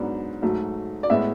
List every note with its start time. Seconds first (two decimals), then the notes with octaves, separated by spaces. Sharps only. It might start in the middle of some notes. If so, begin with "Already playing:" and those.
Already playing: G#2 F#3 B3 D4
0.42 G#2 F#3 A3
1.03 D5
1.10 A2 G#3 B3 E5